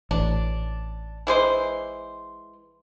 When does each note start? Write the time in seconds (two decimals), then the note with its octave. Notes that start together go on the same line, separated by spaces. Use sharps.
0.11 A1 D4
1.27 E3 G#3 C5